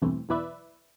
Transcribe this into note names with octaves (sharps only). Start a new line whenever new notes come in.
E2 G2 B2 E3 A3 C4
B1 E2 E4 B4 D5 E5